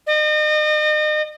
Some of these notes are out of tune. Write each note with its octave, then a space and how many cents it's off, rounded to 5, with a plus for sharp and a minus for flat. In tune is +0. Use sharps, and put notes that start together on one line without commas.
D#5 -40